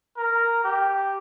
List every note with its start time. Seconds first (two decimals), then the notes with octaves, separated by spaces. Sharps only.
0.18 A#4
0.64 G4